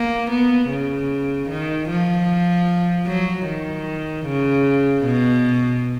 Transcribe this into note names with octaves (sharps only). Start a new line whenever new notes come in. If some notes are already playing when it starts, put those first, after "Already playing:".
Already playing: A#3
B3
C#3
D#3
F3
F#3
D#3
C#3
B2